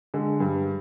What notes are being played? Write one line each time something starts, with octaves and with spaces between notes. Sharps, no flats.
D3 G#3
G2